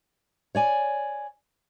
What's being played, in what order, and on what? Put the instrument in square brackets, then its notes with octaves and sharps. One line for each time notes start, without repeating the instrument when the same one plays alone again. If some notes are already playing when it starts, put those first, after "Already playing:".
[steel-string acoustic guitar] C#5 D5 G#5